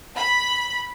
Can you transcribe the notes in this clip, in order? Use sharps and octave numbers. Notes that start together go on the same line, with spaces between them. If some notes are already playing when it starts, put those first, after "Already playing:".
B5